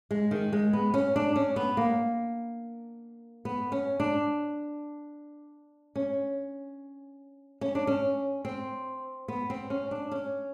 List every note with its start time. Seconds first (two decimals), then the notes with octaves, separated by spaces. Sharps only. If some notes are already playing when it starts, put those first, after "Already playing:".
0.11 G#3
0.31 D#3
0.53 G#3
0.73 B3
0.94 C#4
1.16 D4
1.36 C#4
1.56 B3
1.77 A#3
3.45 B3
3.72 C#4
4.00 D4
5.96 C#4
7.61 C#4
7.75 D4
7.87 C#4
8.45 C4
9.28 B3
9.50 C4
9.70 C#4
9.91 D4
10.12 C#4